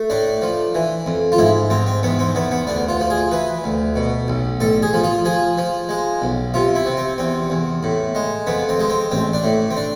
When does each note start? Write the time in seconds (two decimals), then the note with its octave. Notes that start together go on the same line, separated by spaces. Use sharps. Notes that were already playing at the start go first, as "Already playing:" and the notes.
Already playing: A3
0.10 A2 D4
0.42 F3
0.75 E3
1.06 F2
1.32 F4
1.38 G#2 E4
1.70 G#2 C4
1.87 C4
2.03 E2 B3
2.19 C4
2.35 E2 B3
2.51 B3
2.67 D2 D4
2.89 F4
3.00 F3
3.10 G#4
3.31 E3 B4
3.64 D2
3.96 B2
4.28 B1
4.60 A1 A4
4.82 G#4
4.93 F3
5.04 F4
5.25 F3 G#4
5.58 F3
5.89 G#3
6.22 B1
6.54 C3 F4
6.75 E4
6.86 C3
6.97 C4
7.18 E2 C4
7.50 E2
7.83 A2
8.15 G#3
8.47 F2 B3
8.69 C4
8.80 G#3
8.90 C4
9.11 A1 C4
9.33 D4
9.44 A2
9.71 C4
9.77 D4